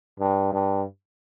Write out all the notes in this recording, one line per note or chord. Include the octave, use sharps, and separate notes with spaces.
G2
G2